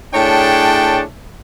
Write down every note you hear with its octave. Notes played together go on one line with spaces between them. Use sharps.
A2 D4 G#4 C#5 G5 A5